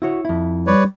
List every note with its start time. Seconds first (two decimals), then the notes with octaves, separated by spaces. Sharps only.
0.02 E4 F#4 C#5
0.25 F2 E4
0.67 G3 B4 C#5 D5